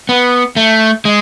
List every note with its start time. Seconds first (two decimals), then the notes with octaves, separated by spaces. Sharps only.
0.09 B3
0.56 A3
1.05 G#3